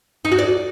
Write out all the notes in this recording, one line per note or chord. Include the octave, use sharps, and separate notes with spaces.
D#4
F#4
D5